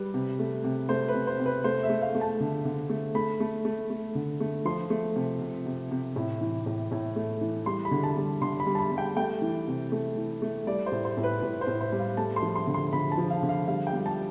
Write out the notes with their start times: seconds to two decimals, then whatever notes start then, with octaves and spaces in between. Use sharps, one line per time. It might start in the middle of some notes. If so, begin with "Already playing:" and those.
Already playing: G3 B4
0.14 C3
0.39 A3
0.64 C3
0.89 A3 C5
1.08 B4
1.14 C3
1.27 C5
1.39 C3
1.46 B4
1.64 A3 C5
1.83 E5
1.90 A3
2.02 F5
2.15 A3
2.21 A5
2.40 D3
2.65 D3
2.90 A3
3.15 A3 B5
3.40 A3
3.65 A3
3.90 A3
4.15 D3
4.40 A3
4.65 F3 C6
4.90 A3
5.16 C3
5.41 C3
5.66 C3
5.91 C3
6.16 A2
6.41 E3
6.66 A2
6.91 A2
7.16 A3
7.41 E3
7.66 G3 C6
7.85 B5
7.91 D3
8.03 A5
8.17 G3
8.42 D3 C6
8.60 B5
8.66 G3
8.75 A5
8.79 B5
8.92 G3
8.98 G5
9.16 A3 G5
9.42 E3
9.67 C3
9.92 A3
10.17 E3
10.42 A3
10.67 G3 D5
10.86 C5
10.92 A2
11.05 C5
11.17 A2
11.24 B4
11.42 A2 B4
11.61 C5
11.67 A2
11.81 C5
11.92 G3
11.99 F5
12.17 A3 A5
12.36 C6
12.42 F3
12.56 C6
12.67 D3
12.74 C6
12.93 D3 B5
13.12 A5
13.18 F3
13.30 F5
13.43 D3
13.49 F5
13.68 G3 F5
13.87 G5
13.93 G3
14.06 A5